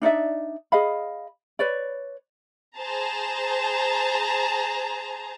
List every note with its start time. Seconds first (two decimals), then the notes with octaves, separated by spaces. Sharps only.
0.02 D4 D#4 D5 E5
0.72 G#4 D#5 F5 B5
1.59 B4 C#5 D5
2.78 G#4 C5 A5 A#5